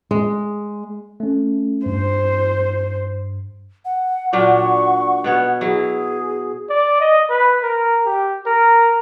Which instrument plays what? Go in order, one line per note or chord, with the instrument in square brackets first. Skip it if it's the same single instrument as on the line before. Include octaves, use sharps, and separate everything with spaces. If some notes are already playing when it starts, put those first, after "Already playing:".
[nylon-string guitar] G#3
[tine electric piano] A3 C#4
[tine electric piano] G2 [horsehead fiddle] C5
[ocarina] F#5
[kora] A#2 F#3 D4 [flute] C#6
[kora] B2 B3 C#5
[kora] F#3 E4 [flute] G#4
[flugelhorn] D5
D#5
B4
A#4
G4
A#4